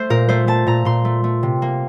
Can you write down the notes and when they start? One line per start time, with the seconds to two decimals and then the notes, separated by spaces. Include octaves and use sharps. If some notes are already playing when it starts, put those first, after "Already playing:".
Already playing: A3 C5
0.10 A#2 A#4
0.29 A3 C5
0.47 A3 A5
0.67 A#2 A#5
0.85 A#2 C6
1.05 A3
1.24 A3
1.43 C3
1.62 A#3